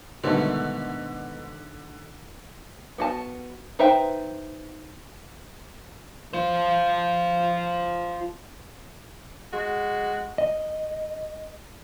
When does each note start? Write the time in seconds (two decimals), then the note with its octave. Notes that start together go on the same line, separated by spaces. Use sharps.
0.24 G#2 B2 D3 D#3 G3 A3
2.98 B3 F#4 A5
3.79 D#4 B4 C5 E5 G5
6.33 F4 C5
9.53 G#3 F#4
10.38 D#5